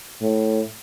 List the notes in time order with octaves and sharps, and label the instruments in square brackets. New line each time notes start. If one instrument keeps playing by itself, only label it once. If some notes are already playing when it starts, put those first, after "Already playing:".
[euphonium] A2